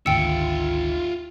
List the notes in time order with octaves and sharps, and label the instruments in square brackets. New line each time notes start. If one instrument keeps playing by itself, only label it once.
[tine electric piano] G#1 D2 C#7 [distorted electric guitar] F4 E5 [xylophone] G5 E6